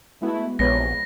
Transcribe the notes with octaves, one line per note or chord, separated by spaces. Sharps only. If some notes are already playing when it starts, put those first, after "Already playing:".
G#3 A3 B3 E4 F#4
A#1 E2 C3 G#3 B3 B4 C#5 A#6